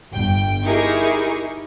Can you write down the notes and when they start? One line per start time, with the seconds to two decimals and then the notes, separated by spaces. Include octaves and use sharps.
0.12 G1 G5
0.63 D#4 E4 G4 G#4 A#4 C#6